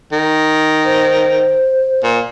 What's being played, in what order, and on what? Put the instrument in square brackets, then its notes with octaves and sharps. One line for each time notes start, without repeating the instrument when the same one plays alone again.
[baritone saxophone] D#3
[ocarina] C5
[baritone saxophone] A#2